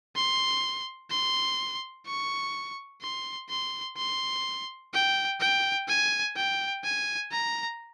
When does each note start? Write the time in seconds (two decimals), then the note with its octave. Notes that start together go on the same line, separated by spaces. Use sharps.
0.16 C6
1.10 C6
2.06 C#6
3.01 C6
3.50 C6
3.97 C6
4.93 G5
5.40 G5
5.88 G#5
6.36 G5
6.84 G#5
7.31 A#5